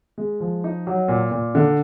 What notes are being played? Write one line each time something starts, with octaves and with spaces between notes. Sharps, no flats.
G#3
F3
D#4
F#3
A#2
A#2
D3